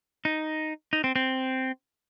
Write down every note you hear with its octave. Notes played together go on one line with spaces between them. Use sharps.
D#4
D#4
C4
C4